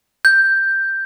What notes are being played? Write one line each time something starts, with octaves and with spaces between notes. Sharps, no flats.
G6